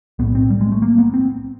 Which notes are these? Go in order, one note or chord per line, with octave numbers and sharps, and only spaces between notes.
B1 A2 B3
C4
G3
G#3
A3
A#3
B3
C4